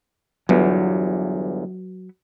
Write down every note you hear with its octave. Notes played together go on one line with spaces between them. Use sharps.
G1 E2 F#3 B3